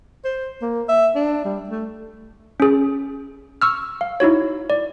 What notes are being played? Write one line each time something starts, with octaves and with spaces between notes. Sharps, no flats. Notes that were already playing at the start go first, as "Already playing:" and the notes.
C5
A#3
E5
D4
G3
A3
C#4 G#4
C#6 E6 F6
F5
D#4 E4 F#4 C#5
D5